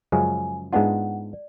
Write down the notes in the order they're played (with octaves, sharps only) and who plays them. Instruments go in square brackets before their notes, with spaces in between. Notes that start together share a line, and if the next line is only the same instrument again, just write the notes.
[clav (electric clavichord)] F#2 C#3 F3 G#3 [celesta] G#5
[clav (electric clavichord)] G#2 G#3 B3 D4 F4 [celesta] F#5
[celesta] D5